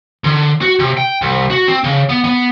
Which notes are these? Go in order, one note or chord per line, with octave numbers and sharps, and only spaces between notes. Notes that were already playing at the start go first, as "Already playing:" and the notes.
D3
F#4
C3
G5
C2
F#4
C4
C#3
B3
B3